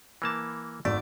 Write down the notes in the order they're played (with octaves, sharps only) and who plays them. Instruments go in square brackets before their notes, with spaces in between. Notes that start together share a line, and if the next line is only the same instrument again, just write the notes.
[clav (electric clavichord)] E3 A#3 A5
[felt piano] G#1 [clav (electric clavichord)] A3 [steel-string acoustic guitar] D5